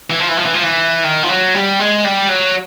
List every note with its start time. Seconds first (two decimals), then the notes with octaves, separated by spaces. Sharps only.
0.10 E3
0.19 F3
0.28 E3
0.37 F3
0.45 E3
0.54 F3
0.63 E3
1.04 D#3
1.23 F3
1.29 F#3
1.54 G3
1.79 G#3
2.05 G3
2.29 F#3